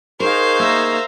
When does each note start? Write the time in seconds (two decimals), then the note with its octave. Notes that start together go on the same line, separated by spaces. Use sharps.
0.20 D#4 G#4 A#4 C5 F5 C#6
0.59 A#3 E5 A#5